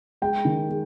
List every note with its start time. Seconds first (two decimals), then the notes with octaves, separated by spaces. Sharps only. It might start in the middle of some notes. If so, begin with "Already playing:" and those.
0.22 G#3 G5
0.45 D#3
0.69 G#3